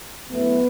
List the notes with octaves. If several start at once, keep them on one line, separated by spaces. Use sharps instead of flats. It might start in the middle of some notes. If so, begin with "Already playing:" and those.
F#2 E3 A3 B3